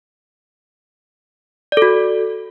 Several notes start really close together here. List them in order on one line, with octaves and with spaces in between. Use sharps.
D5 A4 F#4